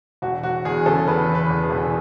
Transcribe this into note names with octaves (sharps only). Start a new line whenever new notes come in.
E1 F#4
E1 F#4
E2 G#4
C#3 A4
E2 B4
E2
B4
E2
G#4
E1